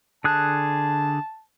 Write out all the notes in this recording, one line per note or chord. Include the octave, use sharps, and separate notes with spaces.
D3 G#4 A5 F#6